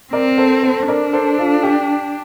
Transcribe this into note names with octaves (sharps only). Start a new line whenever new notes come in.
C4 A#4 D5
A4 C5
A4 C5
D4 A#4 D5
A4 C5
F4 A4
G4